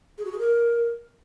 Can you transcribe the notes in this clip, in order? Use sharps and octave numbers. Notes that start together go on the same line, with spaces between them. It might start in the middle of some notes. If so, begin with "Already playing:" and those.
G#4
F#4
G#4
A#4